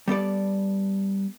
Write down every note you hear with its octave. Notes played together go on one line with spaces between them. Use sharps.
G3 B3 A4 D5